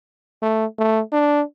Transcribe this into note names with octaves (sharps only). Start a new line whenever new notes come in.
A3
A3
D4